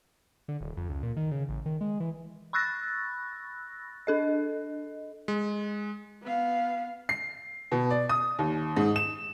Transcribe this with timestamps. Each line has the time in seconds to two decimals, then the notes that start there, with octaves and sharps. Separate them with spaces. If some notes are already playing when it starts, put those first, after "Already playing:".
0.48 D3
0.61 D#1
0.77 F2
0.89 C#2
1.03 A#2
1.17 D#3
1.31 C#3
1.49 A1
1.66 D#3
1.81 G#3
2.00 E3
2.53 B5 C#6 E6 F#6 A6 A#6
4.07 D4 A4 D#5
5.28 G#3
6.22 B3 F5
7.09 C7
7.72 B2
7.90 D5
8.09 D#6
8.39 D#2
8.76 G#2
8.96 E7